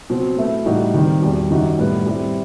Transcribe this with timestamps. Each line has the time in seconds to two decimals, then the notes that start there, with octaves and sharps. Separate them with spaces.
0.10 B2 F#3 C4
0.37 B2 A3 E4 B4
0.66 A2 E3 G3 D#4 F#4
0.94 D#3 G3 C4
1.22 E2 B2 G3
1.50 F#2 D#3 G3 D#4 F#4
1.79 A2 G3 B3
2.07 G3 C4 E4